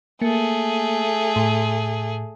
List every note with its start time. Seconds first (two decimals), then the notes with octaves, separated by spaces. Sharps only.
0.22 A3 A#3 G#4
1.36 A2